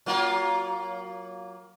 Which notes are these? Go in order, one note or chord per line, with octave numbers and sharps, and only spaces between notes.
F#3 A#3 F4